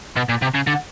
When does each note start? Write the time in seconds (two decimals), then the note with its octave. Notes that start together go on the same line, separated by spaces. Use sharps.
0.16 B2
0.29 A#2
0.42 C3
0.55 C#3
0.67 D3